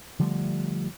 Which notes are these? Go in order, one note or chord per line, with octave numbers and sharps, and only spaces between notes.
D3 F3 G3 A3